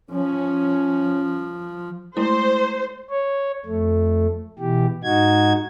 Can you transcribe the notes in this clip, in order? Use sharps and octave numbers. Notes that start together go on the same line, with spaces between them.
F3 C#4
G#3 A3 E4 C5
C#5
F2 A3
B2 E3 G4
G#2 D#4 F#4 G#6